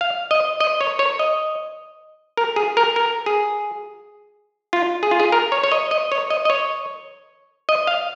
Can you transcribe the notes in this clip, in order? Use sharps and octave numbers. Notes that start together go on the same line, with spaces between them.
F5
D#5
D#5
C#5
C#5
D#5
A#4
G#4
A#4
A#4
G#4
F4
G#4
F4
G#4
A#4
C#5
C#5
D#5
D#5
C#5
D#5
D#5
C#5
D#5
F5